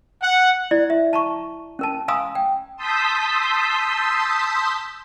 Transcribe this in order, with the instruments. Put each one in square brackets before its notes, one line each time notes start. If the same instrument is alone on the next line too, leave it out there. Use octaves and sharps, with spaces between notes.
[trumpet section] F#5
[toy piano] E4 D5
E5
A5 A#5 C#6
C#4 A#4 A5
F5 G#5 A#5 C6 D#6 E6
G5
[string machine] A5 C6 D#6 E6 G6 B6